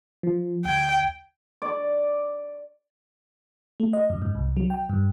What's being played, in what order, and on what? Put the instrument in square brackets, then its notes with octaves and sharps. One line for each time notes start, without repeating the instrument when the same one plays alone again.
[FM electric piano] F3
[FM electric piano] D2 G#6 [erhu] G5
[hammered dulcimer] D5
[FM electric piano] A3
D#5
F#2
G#2
C2
F#3
G5
G2